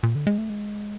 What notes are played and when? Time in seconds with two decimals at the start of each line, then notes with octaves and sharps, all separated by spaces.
0.03 A#2
0.15 D3
0.27 G#3
0.38 A3
0.50 G#3